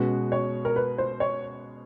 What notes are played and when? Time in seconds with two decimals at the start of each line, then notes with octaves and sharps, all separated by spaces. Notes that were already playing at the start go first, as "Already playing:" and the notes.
Already playing: B2 G#3 C#4 F#4 B4
0.32 C#5
0.65 A#4
0.76 B4
0.98 C5
1.20 C#5